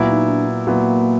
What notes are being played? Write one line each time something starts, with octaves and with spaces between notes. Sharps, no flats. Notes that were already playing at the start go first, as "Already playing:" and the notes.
Already playing: A#2 F#3 B3 E4
D#4
D4
A#2 F#3 A#3 B3 E4